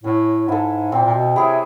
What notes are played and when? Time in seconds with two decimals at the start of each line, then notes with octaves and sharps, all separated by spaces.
0.04 A2 C#4
0.48 G#2 E4 A4
0.92 A#2 C4
1.05 A#2
1.14 B2
1.36 C3 E4 G#4 C#5